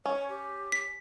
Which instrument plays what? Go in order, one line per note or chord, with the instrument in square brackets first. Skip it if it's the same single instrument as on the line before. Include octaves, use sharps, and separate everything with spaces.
[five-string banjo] C#4 [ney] C#5
[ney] G4
[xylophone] B6